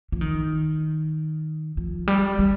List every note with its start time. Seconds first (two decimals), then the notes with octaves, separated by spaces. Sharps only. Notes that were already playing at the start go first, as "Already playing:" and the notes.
0.12 F3
0.21 D#3
1.77 F3
2.08 G3
2.39 G3